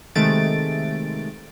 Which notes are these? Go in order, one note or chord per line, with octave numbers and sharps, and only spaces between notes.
C3 D#3 G#3 A3 A6 D7